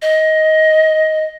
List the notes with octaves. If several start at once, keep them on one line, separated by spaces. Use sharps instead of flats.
D#5